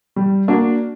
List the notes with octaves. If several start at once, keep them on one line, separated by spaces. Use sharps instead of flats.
G3
A#3 D4 F#4